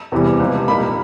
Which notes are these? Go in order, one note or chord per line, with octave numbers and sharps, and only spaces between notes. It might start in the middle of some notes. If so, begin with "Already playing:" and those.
E2 C3 E3 G3
C#2 C3 F3
A#2 G3 A#3 D#4 B5